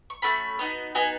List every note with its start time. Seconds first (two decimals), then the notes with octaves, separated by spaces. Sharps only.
0.10 C#6
0.22 A3 C#4 F#4 B5
0.59 B3 D#4 F#4
0.95 B3 D#4 F#4 G#5